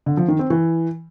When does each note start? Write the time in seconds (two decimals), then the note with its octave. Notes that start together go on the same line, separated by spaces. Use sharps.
0.06 D3
0.17 F3
0.28 D#3
0.39 C4
0.50 E3